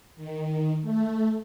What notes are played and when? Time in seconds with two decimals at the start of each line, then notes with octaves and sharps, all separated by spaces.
0.16 D#3
0.82 A3